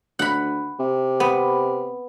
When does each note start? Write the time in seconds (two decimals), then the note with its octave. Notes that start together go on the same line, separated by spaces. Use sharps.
0.19 D2 F#5 B5
0.79 C3
1.20 B3